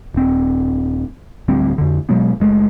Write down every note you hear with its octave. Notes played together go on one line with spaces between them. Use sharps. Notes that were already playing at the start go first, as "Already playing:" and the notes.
D#1 C4
D1 D2 G3 C4
F2 D3
B2 F#3 G#3 B3
F#1 G#3 A3